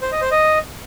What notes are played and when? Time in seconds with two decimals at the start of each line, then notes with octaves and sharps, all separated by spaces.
0.02 C5
0.12 D#5
0.21 C5
0.31 D#5